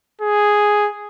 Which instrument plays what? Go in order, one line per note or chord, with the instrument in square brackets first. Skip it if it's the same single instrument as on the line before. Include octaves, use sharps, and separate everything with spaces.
[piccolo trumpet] G#4